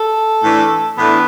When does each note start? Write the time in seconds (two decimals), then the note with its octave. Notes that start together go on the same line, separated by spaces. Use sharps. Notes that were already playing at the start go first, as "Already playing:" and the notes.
Already playing: A4
0.44 A2 E3 A3 D4
0.98 A2 E3 A3 B3 D4 B4